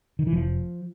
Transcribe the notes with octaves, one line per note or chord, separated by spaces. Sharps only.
D#3
E3
F1 F3